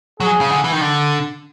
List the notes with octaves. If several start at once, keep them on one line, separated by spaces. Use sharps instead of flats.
F#3 G#4
C#3
D3
E3
D#3
D3